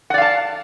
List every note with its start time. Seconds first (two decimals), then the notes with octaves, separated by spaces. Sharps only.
0.10 F#5
0.14 D5
0.18 F5
0.22 A5